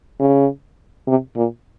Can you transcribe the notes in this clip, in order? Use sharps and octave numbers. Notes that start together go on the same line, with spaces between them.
C#3
C3
A#2